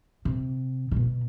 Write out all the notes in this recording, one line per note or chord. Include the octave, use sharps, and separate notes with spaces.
C3
C3
B2